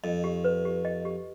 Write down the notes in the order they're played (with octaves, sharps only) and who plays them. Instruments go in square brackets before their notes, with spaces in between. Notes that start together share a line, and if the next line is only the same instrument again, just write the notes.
[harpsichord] F2 [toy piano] D#5
[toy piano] G4
B4
G4
D#5
G4